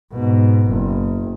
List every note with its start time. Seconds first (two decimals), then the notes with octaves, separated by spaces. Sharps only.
0.12 G#2 B2
0.67 F#1